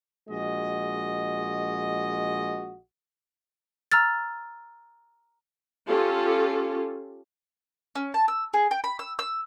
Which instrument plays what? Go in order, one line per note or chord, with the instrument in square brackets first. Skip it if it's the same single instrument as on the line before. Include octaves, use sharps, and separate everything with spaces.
[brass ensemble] A#1 G#3 F#4 D#5
[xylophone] A#5 E6 F6 A6
[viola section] C#4 F4 G4 A4
[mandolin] C#4
A5
E6
G#4
G5
B5
E6
E6